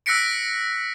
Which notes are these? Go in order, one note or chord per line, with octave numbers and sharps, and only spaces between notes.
E6 F#6 A#6 B6 C#7 D7